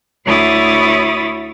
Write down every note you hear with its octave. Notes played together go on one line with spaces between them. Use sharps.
D2 E4 C#5 B5 D#6 A6